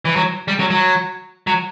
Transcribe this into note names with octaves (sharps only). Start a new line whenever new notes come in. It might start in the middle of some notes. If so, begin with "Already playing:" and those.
E3
F#3
G3
F#3
F#3
F#3